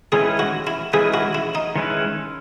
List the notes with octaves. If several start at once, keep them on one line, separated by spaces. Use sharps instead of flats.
D#3 G#3 C#4 E4 G#4 B4
F#4
E4
D#3 G#3 C#4 E4 G#4 B4
F#4
E4
D#4
D#3 G#3 C#4 E4 B4